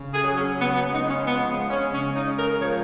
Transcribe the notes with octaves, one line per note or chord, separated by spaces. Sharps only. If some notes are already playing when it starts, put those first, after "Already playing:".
Already playing: C#3
G#4
F#3
C#4
C#3 B3
B3
G#3 D#4
C#4
F3 B3
B3
G#3
C#4
C#3 C#4
D#4
G#3
A#4
F3 C#5